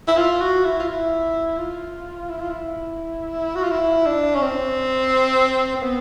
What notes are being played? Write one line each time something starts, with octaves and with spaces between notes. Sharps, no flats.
E4
F4
F#4
E4
F4
E4
F4
E4
F4
E4
F#4
F4
E4
D4
C#4
C4
C4
B3